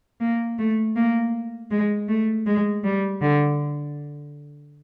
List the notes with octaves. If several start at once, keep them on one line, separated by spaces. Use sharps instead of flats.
A#3
A3
A#3
G#3
A3
G#3
G3
D3